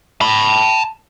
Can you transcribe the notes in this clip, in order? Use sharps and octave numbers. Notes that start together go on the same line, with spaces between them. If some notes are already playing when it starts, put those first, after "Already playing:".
A5 B5